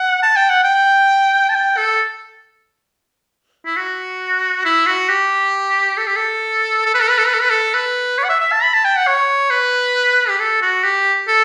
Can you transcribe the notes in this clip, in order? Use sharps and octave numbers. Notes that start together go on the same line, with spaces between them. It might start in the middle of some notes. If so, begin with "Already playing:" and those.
Already playing: F#5
A5
G5
F#5
G5
A5
G5
A4
E4
F#4
E4
F#4
G4
A4
G4
A4
A4
B4
A4
B4
A4
B4
A4
B4
A4
B4
C#5
F#5
E5
E5
A5
B5
A5
G5
F#5
C#5
B4
G4
A4
F#4
G4
A4